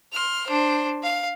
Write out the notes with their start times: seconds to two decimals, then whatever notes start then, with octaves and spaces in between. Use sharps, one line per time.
0.13 C6 F6
0.46 D4 C5
1.03 F5